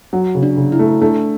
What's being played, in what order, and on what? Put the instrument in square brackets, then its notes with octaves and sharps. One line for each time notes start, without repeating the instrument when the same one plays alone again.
[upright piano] F#3
C#3
[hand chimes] D4
[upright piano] C#3
[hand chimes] E4
[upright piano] A3
[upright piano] A3 [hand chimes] D4